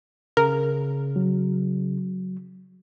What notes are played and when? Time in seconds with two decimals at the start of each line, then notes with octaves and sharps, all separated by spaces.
0.37 C#3 A#4
1.16 F#3